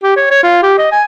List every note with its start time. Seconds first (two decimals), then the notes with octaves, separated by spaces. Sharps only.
0.03 G4
0.17 C#5
0.31 C#5
0.43 F4
0.63 G4
0.78 D#5
0.92 G#5